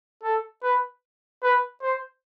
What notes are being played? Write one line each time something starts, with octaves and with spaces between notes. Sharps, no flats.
A4
B4
B4
C5